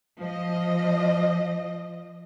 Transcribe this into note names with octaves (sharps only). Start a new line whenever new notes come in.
F3 D#5